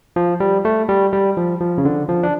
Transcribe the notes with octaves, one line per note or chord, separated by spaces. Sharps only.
F3
G3
A3
G3
G3
F3
F3
C#3
D3
F3
D4